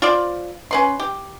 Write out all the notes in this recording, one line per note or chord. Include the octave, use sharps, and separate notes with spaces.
F4 C5 D5
C#4 B4 C6
G4